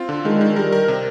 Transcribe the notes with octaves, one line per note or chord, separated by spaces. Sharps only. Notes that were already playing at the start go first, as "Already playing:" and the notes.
Already playing: C4 F4
D3
D#3 G#3
D#3
G3 A#4
A#4
C3